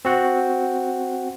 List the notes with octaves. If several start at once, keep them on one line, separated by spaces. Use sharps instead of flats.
C4 F#4 F#5